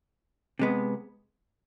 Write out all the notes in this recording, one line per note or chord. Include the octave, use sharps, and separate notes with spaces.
C3 G#3 B3